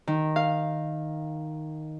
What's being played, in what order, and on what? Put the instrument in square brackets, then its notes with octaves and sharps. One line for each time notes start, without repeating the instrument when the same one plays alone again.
[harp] D#3
F5